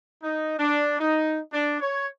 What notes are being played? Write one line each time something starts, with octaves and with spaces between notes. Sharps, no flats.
D#4
D4
D#4
D4
C#5